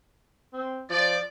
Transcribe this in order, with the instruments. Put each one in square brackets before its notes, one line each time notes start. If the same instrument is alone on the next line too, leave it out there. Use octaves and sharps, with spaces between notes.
[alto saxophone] C4
[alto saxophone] F3 [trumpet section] D5